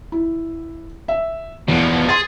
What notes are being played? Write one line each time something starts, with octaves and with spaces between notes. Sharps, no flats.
E4
E5
E2 B2 F3
G#4 C6 A6